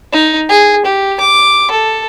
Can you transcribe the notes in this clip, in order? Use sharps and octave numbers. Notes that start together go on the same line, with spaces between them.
D#4
G#4
G4
D6
A4